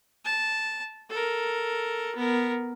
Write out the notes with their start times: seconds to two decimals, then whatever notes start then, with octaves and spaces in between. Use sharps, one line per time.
0.25 A5
1.10 A4 A#4
2.15 B3 A#4